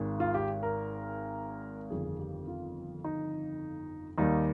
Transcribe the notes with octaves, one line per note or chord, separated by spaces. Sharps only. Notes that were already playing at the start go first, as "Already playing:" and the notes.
Already playing: G#1 G#2 D#3 G#3
F4
G4
A#4
G1 F2 D#3 G#4
G4
F4
D#4
D#2 D#3 G3 A#3 D#4